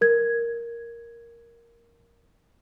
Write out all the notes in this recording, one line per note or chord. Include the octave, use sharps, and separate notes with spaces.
A#4 G#6